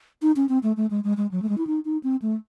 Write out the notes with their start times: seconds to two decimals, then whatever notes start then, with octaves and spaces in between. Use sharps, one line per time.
0.22 D#4
0.36 C#4
0.49 C4
0.63 A3
0.77 A3
0.90 G#3
1.04 G#3
1.17 G#3
1.31 F#3
1.42 A3
1.49 G#3
1.58 E4
1.67 D#4
1.85 D#4
2.04 C4
2.22 A3